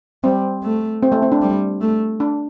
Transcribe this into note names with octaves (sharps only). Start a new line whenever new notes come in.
G3 C4
A3
C4
A3
C4
D4
G3
A3
D4